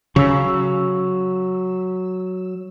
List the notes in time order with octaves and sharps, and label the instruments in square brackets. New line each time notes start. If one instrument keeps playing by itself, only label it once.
[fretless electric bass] C#3 [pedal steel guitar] F#3 E6